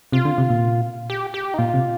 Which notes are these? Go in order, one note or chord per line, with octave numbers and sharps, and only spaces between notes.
C3 F4
D3
C3
A#2
G4
G4
D#4
A#2 F4
C3